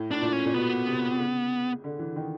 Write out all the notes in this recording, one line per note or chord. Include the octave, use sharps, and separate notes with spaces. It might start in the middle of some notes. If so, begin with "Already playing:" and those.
Already playing: A2
A2 D4
A#2
C#4
A#2
B2 B3
C3
C#3
D3
E3
D#3